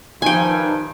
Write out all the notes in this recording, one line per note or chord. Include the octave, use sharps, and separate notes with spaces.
G2 D#3 F3 D#4 G5 G#5